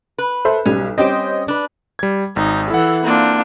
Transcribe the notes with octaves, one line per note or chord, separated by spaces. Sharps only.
B4
A4 C5 E5
B1 G3 C#4
G3 C4 C#4 G4 C5 D#5
D4 B4
G3 G#6
G#1 D#4
E3 E4 A4 F#5
A#3 C4 D4 F4